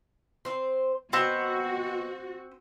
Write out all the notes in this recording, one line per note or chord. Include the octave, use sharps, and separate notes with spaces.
C4 C5
B3 C4 F#4 D#5 F#5